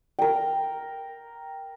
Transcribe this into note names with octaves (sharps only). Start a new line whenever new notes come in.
A#4 G5